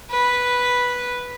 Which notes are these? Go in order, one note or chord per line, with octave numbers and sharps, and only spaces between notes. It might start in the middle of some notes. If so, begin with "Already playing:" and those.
B4